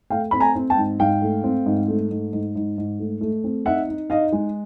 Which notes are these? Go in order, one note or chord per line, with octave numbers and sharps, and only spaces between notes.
A3 F5 G5
C4 B5
G#5 A#5
C4
G5 A5
G#2
G#2 F5 G5
A3
C4
G#2
A3
G#2
G#2
G#2
G#2
A3
A3
C4
D#4 E5 F#5
D#4
D#4 D#5 F5
G#3